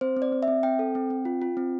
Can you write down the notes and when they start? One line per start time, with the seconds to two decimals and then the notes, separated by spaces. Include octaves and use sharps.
0.01 C4 C5
0.17 C4
0.22 D5
0.32 C4
0.43 E5
0.48 C4
0.63 C4 G5
0.79 A4
0.95 C4
1.10 C4
1.25 F4
1.42 F4
1.57 C4